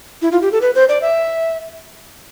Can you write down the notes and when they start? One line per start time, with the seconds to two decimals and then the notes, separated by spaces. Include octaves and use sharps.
0.22 E4
0.32 F4
0.42 G4
0.52 A4
0.61 B4
0.75 C5
0.89 D5
1.01 E5